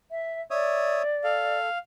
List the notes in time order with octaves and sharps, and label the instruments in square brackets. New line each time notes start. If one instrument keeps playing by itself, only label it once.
[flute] E5
[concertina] C#5 E5 D#6 [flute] D5
[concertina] A4 [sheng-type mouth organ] F5